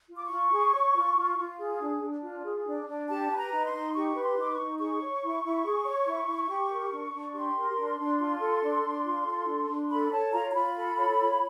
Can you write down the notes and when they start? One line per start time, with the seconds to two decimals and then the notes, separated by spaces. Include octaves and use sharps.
0.10 F4
0.15 D6
0.24 C#6
0.32 F4
0.53 G#4
0.74 C#5
0.96 F4
1.17 F4
1.38 F4
1.59 G#4
1.81 D4
2.03 D4
2.23 F4
2.45 G#4
2.67 D4
2.87 D4
3.08 G4 A5
3.29 B4
3.36 A#5
3.51 D#4
3.65 C6
3.73 D#4
3.94 G4 C#6
4.15 B4
4.22 C6
4.37 D#4 D6
4.50 C#6
4.58 D#4
4.78 G#4 C#6
5.00 C#5
5.22 E4
5.43 E4
5.65 G#4
5.86 C#5
6.06 E4
6.27 E4
6.49 G4
6.70 A#4
6.92 D4
7.13 D4
7.34 G4 C6
7.56 A#4
7.77 D4
7.99 D4
8.20 F4
8.40 A4
8.62 D4
8.84 D4
9.05 F4
9.26 A4
9.47 D4
9.69 D4
9.90 A4 B5
10.11 C#5 A5
10.33 F4 A#5
10.50 A#5
10.54 F4 B5
10.75 A4
10.97 C#5
11.19 F4